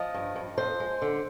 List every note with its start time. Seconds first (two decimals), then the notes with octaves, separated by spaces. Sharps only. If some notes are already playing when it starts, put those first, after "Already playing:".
Already playing: F3 D#5
0.14 G2
0.36 G2
0.58 F2 C5
0.80 G#3
1.02 D3